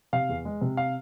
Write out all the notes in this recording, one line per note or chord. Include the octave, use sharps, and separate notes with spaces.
C3 F5
E2
G#3
C3
F5